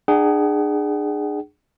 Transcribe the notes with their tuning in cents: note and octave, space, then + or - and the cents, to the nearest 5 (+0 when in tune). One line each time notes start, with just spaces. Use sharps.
D4 +35 G#4 -5 F#5 +40